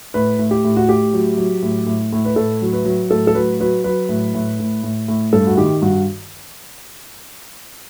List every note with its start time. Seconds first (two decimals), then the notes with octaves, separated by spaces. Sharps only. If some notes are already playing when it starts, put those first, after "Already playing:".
0.14 A2 B4
0.39 A2
0.51 G4
0.64 A2
0.76 F#4
0.89 A2 G4
1.14 F#3
1.37 F#3
1.63 A2
1.87 A2
2.13 A2
2.25 B4
2.36 A2 A4
2.62 F#3
2.73 B4
2.85 F#3
3.11 A2 A4
3.27 A4
3.35 F#3 B4
3.60 F#3 B4
3.84 F#3 B4
4.09 A2
4.34 A2
4.59 A2
4.83 A2
5.08 A2
5.33 G2 A4
5.47 F#4
5.57 D#3 G4
5.82 G2 F#4